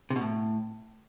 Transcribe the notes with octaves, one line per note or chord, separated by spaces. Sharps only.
C3
B2
A2